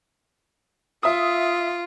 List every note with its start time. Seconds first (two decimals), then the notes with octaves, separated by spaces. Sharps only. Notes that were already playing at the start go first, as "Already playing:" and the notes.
1.03 F4 E5 D#6